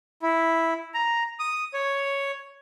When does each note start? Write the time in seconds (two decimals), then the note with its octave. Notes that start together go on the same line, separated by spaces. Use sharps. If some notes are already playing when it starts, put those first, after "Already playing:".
0.22 E4
0.94 A#5
1.39 D#6
1.74 C#5